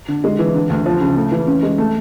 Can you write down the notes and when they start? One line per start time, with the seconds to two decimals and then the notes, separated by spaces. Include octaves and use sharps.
0.08 D3
0.24 G#3
0.39 E3
0.55 D3
0.70 D2
0.86 F3
1.01 C#3
1.17 A3
1.32 E3
1.47 C#4
1.63 G#3
1.78 A3